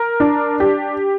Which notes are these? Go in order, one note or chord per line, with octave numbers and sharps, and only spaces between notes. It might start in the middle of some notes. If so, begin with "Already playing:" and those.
Already playing: A#4
D4
G4